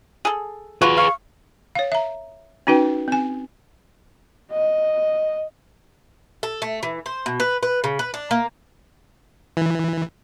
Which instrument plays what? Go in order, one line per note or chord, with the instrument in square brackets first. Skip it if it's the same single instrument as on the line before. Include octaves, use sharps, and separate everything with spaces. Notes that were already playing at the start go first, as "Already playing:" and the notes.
[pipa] G#4 A4
[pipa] F4 F#4 [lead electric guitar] G#4 B4
[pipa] F5 [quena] C#6
[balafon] C#5 F5
E5 A#5
C#4 D#4 F#4 B4 G5
C4 G#5
[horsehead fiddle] D#5
[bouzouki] A4
A3
E3
C5
B2
B4
B4
C#3
B4
D4
A#3
[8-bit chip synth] E3